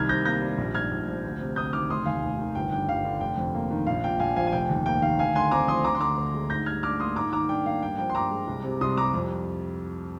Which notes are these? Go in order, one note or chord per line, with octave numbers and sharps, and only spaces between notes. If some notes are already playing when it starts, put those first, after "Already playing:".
Already playing: C2 D#3 F6 G#6
C3 G6 A#6
A#3 G6 A#6
G3
A#1
G#2 F6 G#6
A#1
F3
D2
C3
D2 D#6 G6
D#3 D6 F6
F1 C6 D#6
D#2 F5 G#5
F1
D#3
G1 G5
G2 G5
G1 F5
D3
F1 G5
F2
A#3
D#3
A#1 F5
A#2 G5
A#1 F5 G#5
F3 F5 G#5
G#5
F1 G5
D#2
A#3 G5
D#3 F5
D2 F5 G#5
D3 G#5 C6
C4 A#5 D6
F3 C6 D#6
D2 A#5 D6
C6
D3 A#5 D6
D2
G#3
G#2 G6 A#6
G3 F6 G#6
D4 D6 F6
A#3 C6 D#6
G#2 A#5 D6
D#3 A#5 D6
D4 G5
A#3 F5
G2 G5
F3 G5
C6
G2 A#5 D6
G#3
C2
C3
C2 C6 D#6
G3 A#5 D6
F2